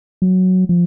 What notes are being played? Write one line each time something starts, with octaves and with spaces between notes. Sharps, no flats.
F#3
F3